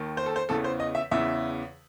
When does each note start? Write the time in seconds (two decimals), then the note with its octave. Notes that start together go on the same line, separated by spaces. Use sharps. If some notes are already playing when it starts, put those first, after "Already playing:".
Already playing: D#2 D#3
0.17 C5
0.26 A4
0.36 C5
0.49 E2 C#3 E3 A4
0.64 C5
0.80 D#5
0.95 E5
1.11 E2 C#3 E3 E5